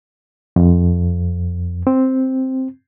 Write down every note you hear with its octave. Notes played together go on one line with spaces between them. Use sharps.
F2
C4